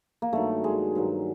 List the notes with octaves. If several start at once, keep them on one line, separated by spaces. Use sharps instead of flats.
A#3
G2 D#3 F#3 A3
G#3
G2 D#3 F#3